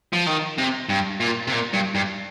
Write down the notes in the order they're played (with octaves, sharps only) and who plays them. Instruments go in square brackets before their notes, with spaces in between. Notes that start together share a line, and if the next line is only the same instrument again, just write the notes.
[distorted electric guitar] F3
D#3
C3
G2
A#2
C3
A#2
G2
G2